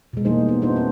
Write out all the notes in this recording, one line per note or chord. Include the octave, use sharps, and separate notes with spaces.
B2 G#3
E3 G3 A#3 D#4 G#4 C5
B3
B3 D4 E4 F#4 C5
C4 B4